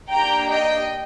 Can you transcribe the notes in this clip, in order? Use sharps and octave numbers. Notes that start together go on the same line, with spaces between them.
A#3 D4 G4 G5 A#5
D#5 G5